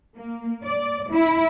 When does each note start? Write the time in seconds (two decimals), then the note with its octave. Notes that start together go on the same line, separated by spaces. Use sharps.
0.17 A#3
0.63 D5
1.11 E4